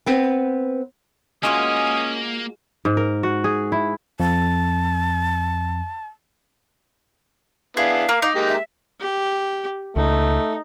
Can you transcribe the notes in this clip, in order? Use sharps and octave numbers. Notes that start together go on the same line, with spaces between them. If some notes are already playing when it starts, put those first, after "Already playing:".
B3 C4 B4
G#3 A#3 C#4 F4 F#4 D#6
G#2
A#4
F#4
G#4
E4
F2 A5
B3 D4 E4 G#4 F5
A#3
D#4 D6
G#3 A#3 G4
E5
G4
C#2 A3 D#4